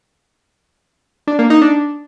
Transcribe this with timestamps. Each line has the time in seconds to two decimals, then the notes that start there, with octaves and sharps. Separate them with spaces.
1.27 D4
1.39 A#3
1.50 D#4
1.62 D4